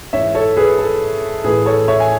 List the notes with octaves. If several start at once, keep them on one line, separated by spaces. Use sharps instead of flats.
G#2 E3 C#5 E5
A4 C#5
G#4 B4
A4
A2 E3 G#4 B4
A4 C#5
C#5 E5
G#5